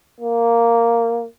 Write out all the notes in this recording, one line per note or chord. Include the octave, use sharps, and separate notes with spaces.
A#3